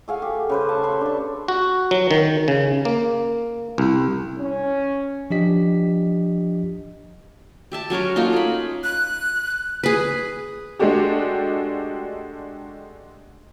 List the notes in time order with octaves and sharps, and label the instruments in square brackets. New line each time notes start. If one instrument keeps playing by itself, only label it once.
[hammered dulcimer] A3 G#4 F5 F#5
G4
C#3 B4 C5
A5 C#6
A4 B5 C6
D4 C#6
[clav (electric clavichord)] F#4
F#3
D#3
C#3
A#3
C2
[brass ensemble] C#4
[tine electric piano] F3 D4 G4 D#5 B6
[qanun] G4 E5 A5
F#3 C#4 A#4 C#5
A3 A#3 D#4 F4
G#4 B5
[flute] F#6
[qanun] G#4 B4
[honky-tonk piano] G#3 A3 D4 F#4 G4